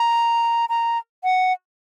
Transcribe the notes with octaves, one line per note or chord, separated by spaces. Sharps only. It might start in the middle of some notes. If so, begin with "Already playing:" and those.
Already playing: A#5
A#5
F#5